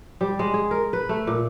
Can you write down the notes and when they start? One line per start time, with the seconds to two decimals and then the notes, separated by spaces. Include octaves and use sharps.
0.21 G3
0.39 G#3
0.54 G#4
0.71 A#4
0.93 B4
1.09 A3
1.27 A#2